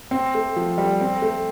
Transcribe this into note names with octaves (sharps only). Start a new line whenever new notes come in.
C4
A3
F3
G3
C4
A3